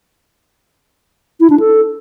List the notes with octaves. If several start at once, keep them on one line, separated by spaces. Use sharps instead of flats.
E4
D4
A4